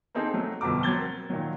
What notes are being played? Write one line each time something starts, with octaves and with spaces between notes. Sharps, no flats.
A#3 C4 D#4 G#4 A4
F#3 A3
G1 F2 B2 A#5 D6
F#3 C4 G#6 A6 G7
A#4
A#2 D#3 F#3